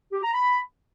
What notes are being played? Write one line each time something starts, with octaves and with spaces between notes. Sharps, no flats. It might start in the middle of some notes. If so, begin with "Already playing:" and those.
G4
A#5
B5